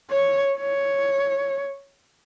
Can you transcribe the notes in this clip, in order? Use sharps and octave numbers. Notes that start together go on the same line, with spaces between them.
C#5
C#5